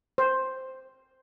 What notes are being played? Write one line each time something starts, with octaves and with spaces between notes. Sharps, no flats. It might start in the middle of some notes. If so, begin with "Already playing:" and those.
C5